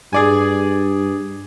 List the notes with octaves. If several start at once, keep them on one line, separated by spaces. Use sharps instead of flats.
G2 G#4 D5 G#5